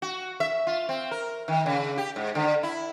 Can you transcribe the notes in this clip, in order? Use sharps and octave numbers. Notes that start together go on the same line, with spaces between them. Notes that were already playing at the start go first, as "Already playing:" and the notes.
F#4
E5
F4
C4
A#4
D#3
C#3
G4
G#2
D3
E4